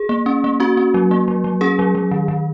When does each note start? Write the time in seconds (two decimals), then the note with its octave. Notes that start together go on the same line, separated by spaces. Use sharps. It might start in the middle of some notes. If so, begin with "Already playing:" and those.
Already playing: G#4
0.09 A#3
0.26 C#4
0.44 A#3
0.60 C#4 F#4
0.77 C#4
0.94 F#3
1.11 A#3
1.28 F#3
1.44 F#3
1.61 C#4 G#4
1.79 F#3
1.95 F#3
2.11 D#3
2.28 D#3